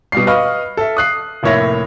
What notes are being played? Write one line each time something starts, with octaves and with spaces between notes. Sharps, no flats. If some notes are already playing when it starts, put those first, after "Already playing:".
B2 G3 C7
B4 D#5 F5 C#6 F6
A4 E5
D#6 F#6 C7
F1 A2 A#3 C#5 E5 A#6